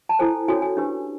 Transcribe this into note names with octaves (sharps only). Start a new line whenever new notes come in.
A5
E4 A4 C5 G#5
C#4 F#4 A4 C#5 G#5
G#5
D4 G4 B4